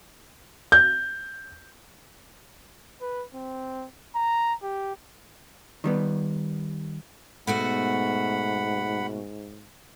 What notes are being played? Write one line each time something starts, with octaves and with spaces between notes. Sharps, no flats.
G6
B4
C4
A#5
G4
D#3 G3 B3
G#2 B2 A3 F#4 F#5 B5